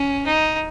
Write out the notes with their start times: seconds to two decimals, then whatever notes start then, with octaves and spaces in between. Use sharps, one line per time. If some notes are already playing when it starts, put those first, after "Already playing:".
Already playing: C#4
0.26 D#4